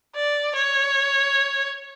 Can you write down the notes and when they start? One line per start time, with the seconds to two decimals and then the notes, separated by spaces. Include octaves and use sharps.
0.15 D5
0.55 C#5